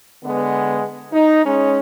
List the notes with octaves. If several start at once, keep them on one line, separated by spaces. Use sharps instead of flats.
D3 G#3 B3
D#4
G#3 C#4